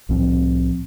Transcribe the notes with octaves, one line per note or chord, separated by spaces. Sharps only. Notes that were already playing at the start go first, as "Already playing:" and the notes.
C2 A2 F3 C4